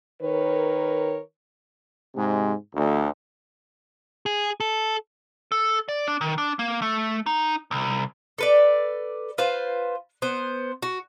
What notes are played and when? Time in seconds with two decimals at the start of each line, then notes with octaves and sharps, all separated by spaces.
0.22 D#3 A#4 B4 C#5
2.15 G#2 C3 G#3
2.74 D2
4.26 G#4
4.60 A4
5.52 A4
5.89 D5
6.08 D4
6.21 D#3
6.38 D4
6.59 A#3
6.82 A3
7.26 D#4
7.71 C2
8.38 A4 B4 D5
9.38 F4 B4 C5
10.22 B3 C5
10.82 F#4